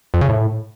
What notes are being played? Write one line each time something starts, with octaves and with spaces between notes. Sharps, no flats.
F2
C#3
A2